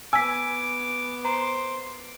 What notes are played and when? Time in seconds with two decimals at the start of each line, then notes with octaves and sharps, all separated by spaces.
0.13 B3 G#5 D6 E6 B6
1.25 C5 A#5